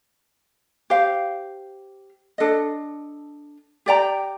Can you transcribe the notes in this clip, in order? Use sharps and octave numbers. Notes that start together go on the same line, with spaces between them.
G4 C5 F5
D4 A4 D#5
G4 D5 G5 A#5